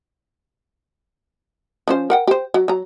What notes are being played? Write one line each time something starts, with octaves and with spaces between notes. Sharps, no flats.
F3 C#4 C5
A#4 F#5 G5
G4 C5
F#3
F#3 A#5